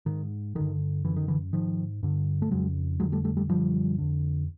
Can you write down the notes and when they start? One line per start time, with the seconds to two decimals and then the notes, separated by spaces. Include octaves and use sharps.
0.06 G#2 D#3
0.55 G2 D3 D#3
1.05 F#2 D3 E3
1.16 D#3
1.28 D3 E3
1.53 G#2 D#3 F3
2.03 G2 D3
2.42 A3
2.51 F2 C#3 F#3 G#3
3.00 F2 D3 F#3 G#3
3.12 G3 A3
3.24 G3 A3
3.37 G3 A3
3.49 F#2 D3 F3 G3
3.98 F2 D3